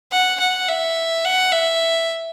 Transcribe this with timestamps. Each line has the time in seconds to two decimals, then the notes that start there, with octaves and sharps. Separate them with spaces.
0.11 F#5
0.40 F#5
0.68 E5
1.25 F#5
1.52 E5